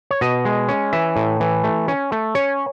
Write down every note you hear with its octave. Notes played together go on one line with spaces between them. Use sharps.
C#5
B2 D#5
G#3
C#4
E3 E5
A2
E3
A3
C#4
A3
C#4 C#5